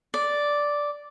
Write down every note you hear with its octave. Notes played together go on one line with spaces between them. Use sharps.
D5